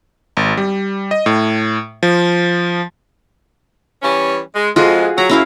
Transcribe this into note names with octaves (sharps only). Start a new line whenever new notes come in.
G#1
G3
D#5
A2
F3
E3 G3 C#4
G#3
F2 G#3 F4 F#4 G#4
F#3 A#5
F#2 C#4 E4 F5